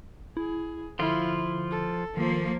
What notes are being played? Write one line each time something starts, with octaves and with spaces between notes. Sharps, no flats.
E4 G#4
D3 F3 E4 F4
A4
D#3 F3 A#3